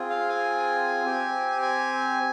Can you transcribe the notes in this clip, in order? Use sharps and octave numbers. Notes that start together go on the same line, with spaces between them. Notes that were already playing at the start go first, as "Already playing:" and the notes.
Already playing: C4 F4 G#4
F5
G#5
C4 G4
G#5